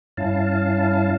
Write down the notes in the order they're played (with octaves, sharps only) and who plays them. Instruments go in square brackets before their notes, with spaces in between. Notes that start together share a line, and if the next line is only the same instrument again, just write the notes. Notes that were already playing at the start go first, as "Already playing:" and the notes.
[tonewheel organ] G2 C#4 E4 F5 A5